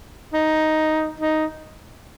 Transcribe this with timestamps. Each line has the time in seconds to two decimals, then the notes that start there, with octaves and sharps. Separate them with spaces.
0.34 D#4
1.20 D#4